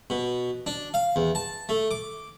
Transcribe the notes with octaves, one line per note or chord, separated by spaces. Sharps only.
B2
D4
F5
E2
A5
A3
D6